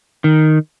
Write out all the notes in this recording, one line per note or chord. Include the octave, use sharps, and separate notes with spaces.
D#3